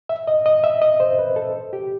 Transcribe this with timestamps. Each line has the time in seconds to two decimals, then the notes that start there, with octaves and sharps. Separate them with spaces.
0.09 E5
0.27 D#5
0.46 D#5
0.64 E5
0.82 D#5
1.00 C5
1.19 B4
1.36 A4
1.73 G4